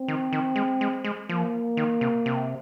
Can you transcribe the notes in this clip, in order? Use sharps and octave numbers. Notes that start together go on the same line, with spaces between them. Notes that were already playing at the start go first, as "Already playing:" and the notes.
Already playing: C4
D#3
D#3
G#3
G#3
G#3
F3 A#3
D#3
C3
C3